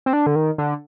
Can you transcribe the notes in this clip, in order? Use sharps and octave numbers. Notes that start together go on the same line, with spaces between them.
C4
D4
D3
D#3
D3